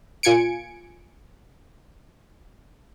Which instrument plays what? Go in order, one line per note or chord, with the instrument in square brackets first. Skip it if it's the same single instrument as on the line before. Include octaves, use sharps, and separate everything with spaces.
[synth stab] A#2 F4 G#5 G#6 C#7 D7